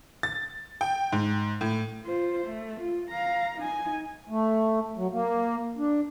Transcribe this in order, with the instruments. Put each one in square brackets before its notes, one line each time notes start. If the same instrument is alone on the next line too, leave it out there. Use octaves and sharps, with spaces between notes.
[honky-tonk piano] A6
G5
G#2
A2
[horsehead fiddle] F4 C5
A3
F4
F5 A#5
D#4 G#5
[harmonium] A3
F#3
A#3
D4